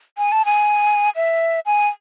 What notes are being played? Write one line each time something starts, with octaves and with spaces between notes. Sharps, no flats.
G#5
A5
G#5
E5
G#5